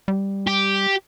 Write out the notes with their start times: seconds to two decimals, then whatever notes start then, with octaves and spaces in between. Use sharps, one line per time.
0.08 G3
0.47 G4